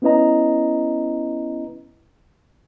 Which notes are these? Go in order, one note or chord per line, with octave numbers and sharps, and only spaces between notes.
B3 C#4 E4 B4 D#5 A#5